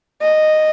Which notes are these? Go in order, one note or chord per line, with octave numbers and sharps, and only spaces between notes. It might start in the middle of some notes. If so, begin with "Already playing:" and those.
D#5